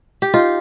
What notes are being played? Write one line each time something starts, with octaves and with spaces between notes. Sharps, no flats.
G4
D#4 F4